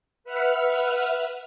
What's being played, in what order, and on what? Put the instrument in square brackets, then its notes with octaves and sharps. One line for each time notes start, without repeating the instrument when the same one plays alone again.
[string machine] B4 E5 F#5 F6